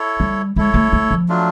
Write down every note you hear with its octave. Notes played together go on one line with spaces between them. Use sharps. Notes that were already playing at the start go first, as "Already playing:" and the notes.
Already playing: E4 A4 C#5
G3
G#3 E4 A4 C#5
A3
A3
F3
F#3 A3 D4 F4